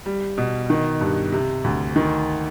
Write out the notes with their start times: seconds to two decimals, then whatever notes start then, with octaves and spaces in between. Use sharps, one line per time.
0.06 G3
0.38 B2
0.70 D#3
1.01 G2
1.32 C3
1.64 D2
1.96 D#3